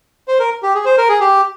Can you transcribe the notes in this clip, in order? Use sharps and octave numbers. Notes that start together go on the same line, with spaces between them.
C5
A#4
G4
G#4
C5
A#4
G#4
G4